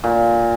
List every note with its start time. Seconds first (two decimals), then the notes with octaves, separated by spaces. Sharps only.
0.04 A#2